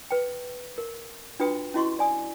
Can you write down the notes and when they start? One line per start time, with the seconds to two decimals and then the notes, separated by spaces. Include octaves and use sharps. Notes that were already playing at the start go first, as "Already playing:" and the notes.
0.11 B4 G5
0.78 A#4
1.40 D4 F4 F#4 B4 G5 D#6
1.74 C#4 E4 F#4 D#5 C6 C#6
1.99 D5 G#5 D#6